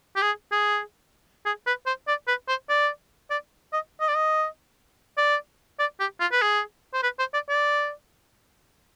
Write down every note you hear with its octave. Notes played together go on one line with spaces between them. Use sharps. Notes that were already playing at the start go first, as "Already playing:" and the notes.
G4
G#4
G#4
G#4
B4
C5
D5
B4
C5
D5
D5
D#5
D#5
D5
D#5
D5
D5
G4
F4
B4
G#4
C5
B4
C5
D5
D5